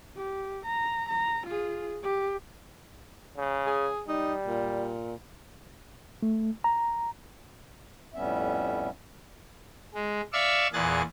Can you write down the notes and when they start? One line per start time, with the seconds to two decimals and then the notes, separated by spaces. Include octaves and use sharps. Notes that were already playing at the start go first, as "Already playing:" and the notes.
0.17 G4
0.65 A#5
1.09 A#5
1.46 F4 G#4
2.03 G4
3.37 C#3
3.67 G#4
4.08 G3 D#4
4.47 A#2
6.23 A3
6.64 A#5
8.14 F2 A2 G3 B3 C#4 E5
9.94 G#3
10.33 D5 E5 F5 C#6 E6
10.73 E2 A#2 G#4 F#6 A6